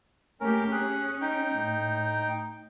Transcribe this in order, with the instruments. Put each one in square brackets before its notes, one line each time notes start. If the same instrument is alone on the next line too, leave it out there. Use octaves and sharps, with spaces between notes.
[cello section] A3 A#3 G4 [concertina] C#4 A#4
[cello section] C#4 [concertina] G#4 F#6
[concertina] D#4 G5
[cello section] A2